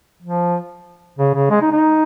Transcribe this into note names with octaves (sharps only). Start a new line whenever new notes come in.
F3
C#3
C#3
G#3
D#4
D#4